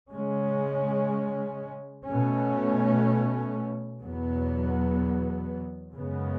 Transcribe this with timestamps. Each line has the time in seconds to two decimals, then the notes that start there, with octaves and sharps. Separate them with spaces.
0.13 C#3 G#3 C#4
2.06 B2 A3 C#4
4.02 E2 B2 F#3 B3
5.96 F#2 C#3 G#3 B3